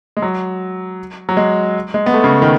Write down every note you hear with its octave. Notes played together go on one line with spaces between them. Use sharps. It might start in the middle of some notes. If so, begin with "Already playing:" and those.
G#3
F#3
F#3
G#3
G#3
B3
A3
C#3
D#3